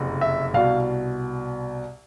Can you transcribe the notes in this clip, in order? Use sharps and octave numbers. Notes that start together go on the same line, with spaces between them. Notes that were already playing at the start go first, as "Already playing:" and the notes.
Already playing: F#1 F2 C3
E5
C2 B2 F5